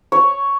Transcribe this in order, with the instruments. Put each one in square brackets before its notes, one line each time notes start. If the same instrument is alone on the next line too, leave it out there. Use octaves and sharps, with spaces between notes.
[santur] C#5